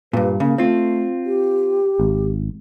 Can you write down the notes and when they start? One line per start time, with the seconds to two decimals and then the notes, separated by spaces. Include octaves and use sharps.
0.13 G2 A#2 B4
0.40 C#3 A#3
0.58 A3 C4 F4
1.25 G4
2.00 G#1